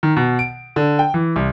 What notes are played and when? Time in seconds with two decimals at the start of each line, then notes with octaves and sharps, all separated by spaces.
0.03 D#3
0.16 B2
0.39 D7
0.76 D3
0.99 G5
1.14 E3
1.36 C2